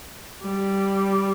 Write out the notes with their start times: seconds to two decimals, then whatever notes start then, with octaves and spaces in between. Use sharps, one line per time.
0.42 G3